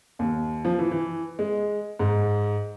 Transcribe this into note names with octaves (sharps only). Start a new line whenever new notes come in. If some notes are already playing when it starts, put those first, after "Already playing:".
D#2
F3
E3
E3
G#3
G#2